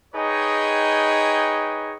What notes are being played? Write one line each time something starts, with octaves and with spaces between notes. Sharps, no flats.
D#4 G#4 B4 C#5 D#5 G5